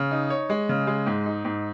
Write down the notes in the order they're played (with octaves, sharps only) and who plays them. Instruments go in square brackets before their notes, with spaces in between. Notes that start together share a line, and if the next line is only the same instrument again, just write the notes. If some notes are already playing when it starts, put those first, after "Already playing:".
Already playing: [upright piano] C#3
D#4
C#5
G#3
C#3
G#3
G#2
D#4
G#2